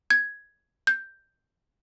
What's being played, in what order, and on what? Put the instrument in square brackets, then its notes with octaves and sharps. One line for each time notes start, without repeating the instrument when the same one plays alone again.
[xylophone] G#6
G6